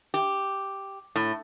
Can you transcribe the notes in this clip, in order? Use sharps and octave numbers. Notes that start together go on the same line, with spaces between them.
G4
A2